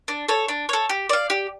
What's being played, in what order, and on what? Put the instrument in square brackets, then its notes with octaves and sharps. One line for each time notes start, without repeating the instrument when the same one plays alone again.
[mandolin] D4
A4 C#5
D4
A4 C#5
G4
D5 F5
G4